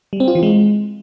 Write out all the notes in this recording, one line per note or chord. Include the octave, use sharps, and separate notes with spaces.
G3
C4
F4
E3
G#3